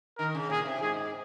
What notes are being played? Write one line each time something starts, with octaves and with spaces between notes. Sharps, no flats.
D#3 A#4
C#3
A#2 G#4
C3
G#2 G#4